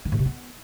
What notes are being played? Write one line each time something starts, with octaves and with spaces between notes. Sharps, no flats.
D#3
A2
C3
B3